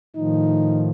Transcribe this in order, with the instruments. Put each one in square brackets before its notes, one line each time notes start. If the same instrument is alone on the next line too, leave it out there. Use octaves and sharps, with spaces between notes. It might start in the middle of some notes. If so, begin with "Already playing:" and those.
[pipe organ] A2 D#3 F3 [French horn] D#4